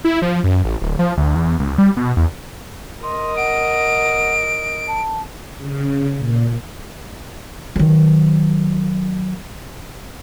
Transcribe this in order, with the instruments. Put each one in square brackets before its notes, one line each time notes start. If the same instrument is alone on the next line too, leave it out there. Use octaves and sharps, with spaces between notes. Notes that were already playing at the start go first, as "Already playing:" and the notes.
[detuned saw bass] E4
F3
F#2
A1
D1
F3
D2
E2
C#2
G3
B2
E2
[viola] A#4 D#5 [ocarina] C6
[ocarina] F#5 [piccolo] D7
[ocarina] A5
[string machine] C#3
A#2
[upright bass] D#3 F#3